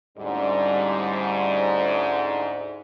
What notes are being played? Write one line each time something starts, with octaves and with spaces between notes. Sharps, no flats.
D2 G#2 G3 C#4 E4 D5